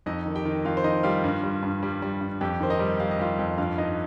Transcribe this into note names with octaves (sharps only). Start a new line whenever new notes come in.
F2 D#4 D#5
D#3
G4 G5
D#3
F2 F4 F5
C5
D#3 D#4 D#5
G3 F4 F5
G2
G3
G2
G3
G3
G2
F2 G4 G5
D#3 C5
D#4 D#5
G3
G3 F5
D#5
G3 F4 F5
F2
G2 F4 F5
G2 D#4 D#5